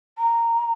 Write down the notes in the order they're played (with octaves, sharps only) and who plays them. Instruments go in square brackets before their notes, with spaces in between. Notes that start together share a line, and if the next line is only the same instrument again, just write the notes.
[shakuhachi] A#5